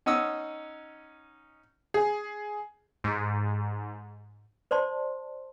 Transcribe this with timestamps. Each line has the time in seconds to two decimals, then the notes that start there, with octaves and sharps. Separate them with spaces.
0.06 C#4 D#4 F#5 D#6 E6
1.94 G#4
3.04 G#2
4.71 C5 D5 A5 C6